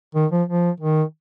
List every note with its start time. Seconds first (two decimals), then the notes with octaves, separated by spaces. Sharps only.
0.15 D#3
0.32 F3
0.48 F3
0.80 D#3